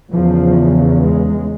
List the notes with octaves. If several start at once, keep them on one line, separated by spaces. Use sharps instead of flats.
E2 C#3 F3
G#3